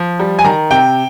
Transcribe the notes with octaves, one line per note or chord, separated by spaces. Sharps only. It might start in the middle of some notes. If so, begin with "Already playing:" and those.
Already playing: F3
G3
G#5
D#3 A#5
C3 G5